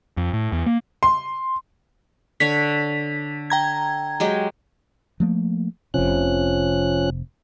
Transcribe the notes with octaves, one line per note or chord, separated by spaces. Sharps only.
F2
A2
E2
A#3
C6
D3 C#5 B6
G5 A#5 G#6
F#3 G#3 G4
F3 A3 A#3
F1 C3 F3 C#4 F#6